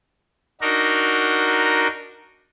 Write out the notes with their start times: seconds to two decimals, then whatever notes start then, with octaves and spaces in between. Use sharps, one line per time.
0.61 D4 D#4 F#4 A#4